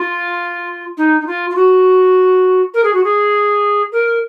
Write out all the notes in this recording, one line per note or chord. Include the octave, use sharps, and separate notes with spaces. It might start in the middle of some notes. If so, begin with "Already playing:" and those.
Already playing: F4
D#4
D#4
F4
F4
F#4
A#4
G#4
F#4
G#4
A#4